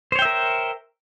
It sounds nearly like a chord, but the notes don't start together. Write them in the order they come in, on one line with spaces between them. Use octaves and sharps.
C5 C#5 G5 E5 A#4